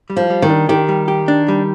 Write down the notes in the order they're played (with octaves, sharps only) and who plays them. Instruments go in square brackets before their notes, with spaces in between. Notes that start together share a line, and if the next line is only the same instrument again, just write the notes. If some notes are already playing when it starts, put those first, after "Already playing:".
[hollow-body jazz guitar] G3
[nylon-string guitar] F3
[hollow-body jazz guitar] G3
[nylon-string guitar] D#3
[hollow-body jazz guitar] D4
[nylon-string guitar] D#3 [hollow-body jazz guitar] G4
[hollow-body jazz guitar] G3
G4
D4
G3